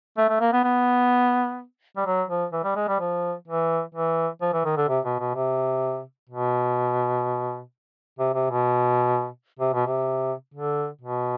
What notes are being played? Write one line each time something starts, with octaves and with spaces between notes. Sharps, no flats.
A3
A3
A#3
B3
B3
G3
F#3
F3
E3
G3
G#3
G3
F3
E3
E3
F3
E3
D#3
D3
C3
B2
B2
C3
B2
C3
C3
B2
C3
B2
C3
D3
B2